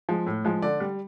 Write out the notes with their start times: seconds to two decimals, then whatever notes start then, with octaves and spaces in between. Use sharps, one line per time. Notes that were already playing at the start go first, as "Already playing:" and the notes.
0.09 F3 G#3
0.27 A2
0.45 F3 G#3
0.62 D3 D5
0.80 G3